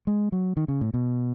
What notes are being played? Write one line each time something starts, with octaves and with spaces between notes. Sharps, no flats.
G#3
F#3
D#3
C#3
A2
B2